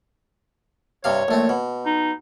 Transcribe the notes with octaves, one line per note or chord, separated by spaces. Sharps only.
G2 C3 C#5 F5
A#1 A3 C4
B2
D#4